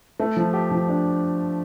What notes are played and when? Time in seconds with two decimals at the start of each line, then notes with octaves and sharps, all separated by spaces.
0.20 A3
0.37 F3
0.53 G4
0.71 F3
0.88 D4